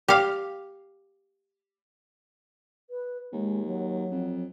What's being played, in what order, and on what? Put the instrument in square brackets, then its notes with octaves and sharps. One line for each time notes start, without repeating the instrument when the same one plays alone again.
[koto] G4 F5
[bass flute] B4
[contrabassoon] D#2 [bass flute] G#3
[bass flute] F#3
[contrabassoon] F2